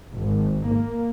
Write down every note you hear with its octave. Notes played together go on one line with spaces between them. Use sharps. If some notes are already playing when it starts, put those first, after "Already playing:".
G#1
A#3